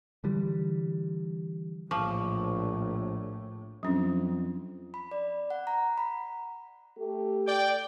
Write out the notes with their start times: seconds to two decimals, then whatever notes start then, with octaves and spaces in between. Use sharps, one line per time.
0.24 D3 E3 G3
1.91 A#1 A2 F3 C#6 D6
3.83 F2 F#3 C#4 D4
4.94 B5
5.11 D5
5.50 F#5
5.67 A#5
5.98 B5
6.98 A3 G4 A4
7.47 D5 G5